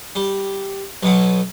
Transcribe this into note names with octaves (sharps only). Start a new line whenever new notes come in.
G3
B1 B2 F#3